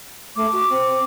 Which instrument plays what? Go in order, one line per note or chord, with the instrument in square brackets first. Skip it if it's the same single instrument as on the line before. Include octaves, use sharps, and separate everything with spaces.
[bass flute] A3 [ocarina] D6
[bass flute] F#4
C4